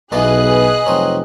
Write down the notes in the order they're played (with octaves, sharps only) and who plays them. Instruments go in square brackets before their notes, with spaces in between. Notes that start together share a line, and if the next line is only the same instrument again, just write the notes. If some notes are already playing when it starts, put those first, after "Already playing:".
[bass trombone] B1 [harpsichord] B2 E3 B3 [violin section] G#4 B4 F#6 [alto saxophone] D#5
[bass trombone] F1 [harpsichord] F#3 C4